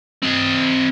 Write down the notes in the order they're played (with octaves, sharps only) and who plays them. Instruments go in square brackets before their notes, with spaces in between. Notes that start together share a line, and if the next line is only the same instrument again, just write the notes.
[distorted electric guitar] C4 D#5